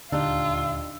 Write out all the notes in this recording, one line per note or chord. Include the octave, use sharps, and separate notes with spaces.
D#1 D2 D3 D4 D#4 F4 G4 E6